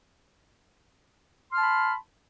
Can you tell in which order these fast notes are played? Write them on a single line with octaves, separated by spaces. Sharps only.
C6 F6 A5 B5